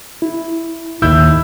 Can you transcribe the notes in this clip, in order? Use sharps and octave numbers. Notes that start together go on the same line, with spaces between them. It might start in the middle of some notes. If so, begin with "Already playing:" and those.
E4
D#2 A2 E4 E6 G6